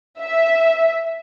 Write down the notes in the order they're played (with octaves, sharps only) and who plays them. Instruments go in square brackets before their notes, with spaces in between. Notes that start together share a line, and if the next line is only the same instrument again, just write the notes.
[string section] E5